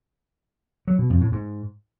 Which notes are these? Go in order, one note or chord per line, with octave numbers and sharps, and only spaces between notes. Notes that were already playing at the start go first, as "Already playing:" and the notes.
F#3
B2
F2
A2
G#2